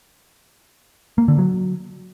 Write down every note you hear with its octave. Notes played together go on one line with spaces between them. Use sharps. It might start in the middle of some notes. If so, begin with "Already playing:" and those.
A#3
D3
F#3